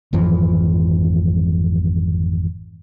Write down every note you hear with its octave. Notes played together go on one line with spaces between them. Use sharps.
G#1 F2 E3 F3